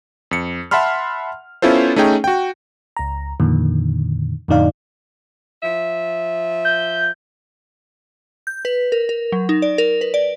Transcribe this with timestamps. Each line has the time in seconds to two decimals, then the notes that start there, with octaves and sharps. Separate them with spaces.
0.31 F2 C#7
0.71 E5 F#5 A5 B5 C6 F6
1.62 B3 C#4 E4 F4 A4 C5
1.96 A3 C#4 D#4 G#4 G5
2.24 F#4 G5
2.97 C#2 A#5
3.40 F2 A#2 D3 D#3
4.48 F2 A2 D3 D#4 D5 F5
5.63 F3 E5
6.65 G6
8.47 G6
8.65 B4
8.92 A#4
9.09 A#4
9.32 F#3
9.49 D#4
9.62 D5
9.78 A#4
10.01 B4
10.14 D5